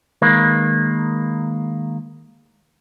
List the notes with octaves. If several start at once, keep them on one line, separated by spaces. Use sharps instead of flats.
D#3 G#3 A#3 B4